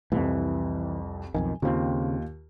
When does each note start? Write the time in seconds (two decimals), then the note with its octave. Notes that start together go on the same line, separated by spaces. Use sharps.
0.12 C2 F2 E3
1.35 B1 F2 D#3 G#5
1.62 D#2 C#3 C4 F4